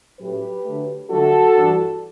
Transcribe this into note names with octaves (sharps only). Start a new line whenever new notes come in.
A2 F#3 A3 C#4 G4 B4
D3 F#3 A3
D3 F#3 A3 D4 F#4 A4
G2 E3 G3 D4